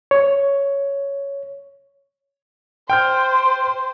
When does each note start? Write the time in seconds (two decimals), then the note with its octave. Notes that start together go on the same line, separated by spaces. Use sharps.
0.11 C#5
2.90 C5 G5 F6 G6